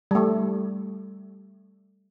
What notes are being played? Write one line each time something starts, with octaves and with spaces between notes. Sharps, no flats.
G3 A3